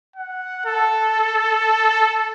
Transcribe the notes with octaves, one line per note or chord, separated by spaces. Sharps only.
F#5
A4